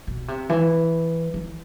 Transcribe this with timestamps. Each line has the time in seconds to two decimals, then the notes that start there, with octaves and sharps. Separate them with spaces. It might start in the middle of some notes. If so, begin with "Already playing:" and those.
0.07 B2
0.28 C3
0.49 E3
1.34 E3